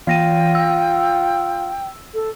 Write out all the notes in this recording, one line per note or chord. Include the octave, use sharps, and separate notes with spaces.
E3 F4 G5 A#6 D#7
E6
A4